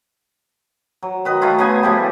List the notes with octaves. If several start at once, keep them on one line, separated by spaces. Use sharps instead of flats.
F#3
D#3 B4 D#5
D#3 A3 E4 F4
C#3 B3 G#5
A2 F3 G3 G4